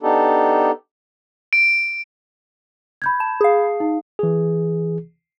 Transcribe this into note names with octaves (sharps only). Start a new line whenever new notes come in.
B3 D4 D#4 G4 A4
D7
B5 G6 G#6
A5
G#4 F5
D#4
E3 G#4